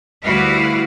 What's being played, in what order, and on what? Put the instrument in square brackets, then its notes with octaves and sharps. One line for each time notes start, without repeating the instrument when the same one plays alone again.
[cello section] D2 G3 E4 F#4 B4 F5